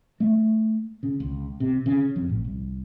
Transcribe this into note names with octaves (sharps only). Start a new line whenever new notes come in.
A3
C#3
C#2
C3
C#3
F2
A1
C2